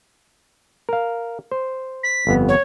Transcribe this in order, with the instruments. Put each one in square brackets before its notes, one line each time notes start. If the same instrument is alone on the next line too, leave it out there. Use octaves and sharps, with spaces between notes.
[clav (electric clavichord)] A#4 F5
C5
[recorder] B6
[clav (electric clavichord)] G1 F2 B3
[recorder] C#5